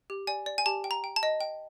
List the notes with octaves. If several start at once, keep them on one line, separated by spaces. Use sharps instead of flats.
G4
D5 G#5
D5
G#5
G4 A5
G5
A#5
G5
A5
D#5
G5